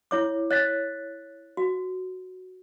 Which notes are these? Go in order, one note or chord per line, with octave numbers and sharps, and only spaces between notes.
E4 C#5 D6
C#5 F#6 A6 B6
F#4